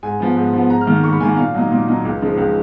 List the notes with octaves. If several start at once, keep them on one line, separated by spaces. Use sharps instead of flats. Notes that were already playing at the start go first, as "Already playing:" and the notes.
G#2 G#5
F3 B3
G#2
F3 B3
G#2 A#5
F6
D#3 A#3
G#2 C#6
B5
D#3 A#3 G#5
F#5
A#2 F5
F#3 A#3 D#4
A#2
F#3 A#3 D#4
C#2
C#3 F3 G#3 D#4
C#2